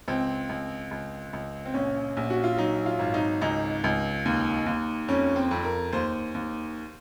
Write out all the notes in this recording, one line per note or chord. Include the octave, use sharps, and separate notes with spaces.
C#2 C4
C#2
C#2
C#2
C4
A#1 C#4
A#1
F#4
F4
F#3 D#4
F4
G#1
D#4
C#2 D#4
C#2
D#2
D#2
F2 C#4
C4
F2
A#4
D#2 C5
D#2